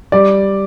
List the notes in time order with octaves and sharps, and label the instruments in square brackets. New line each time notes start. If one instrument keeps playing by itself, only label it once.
[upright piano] G3 D5